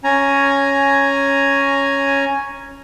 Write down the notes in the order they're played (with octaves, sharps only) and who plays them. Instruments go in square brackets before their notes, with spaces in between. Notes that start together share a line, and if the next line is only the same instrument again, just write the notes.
[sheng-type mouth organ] C#4 G#5 A#5